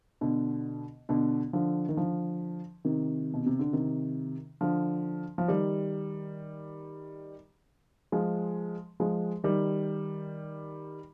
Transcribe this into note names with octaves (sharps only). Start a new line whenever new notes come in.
B2 D3
B2 D3
D3 F3
D#3
D3 F3
C3 D#3
B2
C3
D3
C3 D#3
D3 F3
F3
D#3 G3
F3 G#3
F3 G#3
D#3 G3